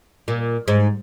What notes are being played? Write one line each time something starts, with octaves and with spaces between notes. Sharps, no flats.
A#2
G#2